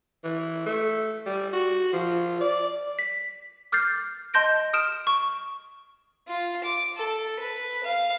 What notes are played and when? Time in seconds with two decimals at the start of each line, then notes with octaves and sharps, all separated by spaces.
0.24 E3
0.66 A3
1.26 G3
1.53 F#4
1.93 F3
2.41 D5
2.99 B6
3.72 D6 F6 G6 A6 C7
4.34 D#5 A5 C6 G6 A#6 D7
4.73 D#6 F6 D7 E7
5.07 C#6
6.28 F4
6.64 D6
6.96 A4
7.40 B4
7.83 F5